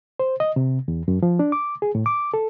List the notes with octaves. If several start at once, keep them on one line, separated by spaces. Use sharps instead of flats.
C5
D#5
C3
E2
F#2
F3
D4
D6
G#4
A2
D6
A4